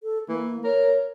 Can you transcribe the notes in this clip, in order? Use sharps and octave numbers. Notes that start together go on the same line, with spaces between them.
A4
E3 A#3
A#4 C#5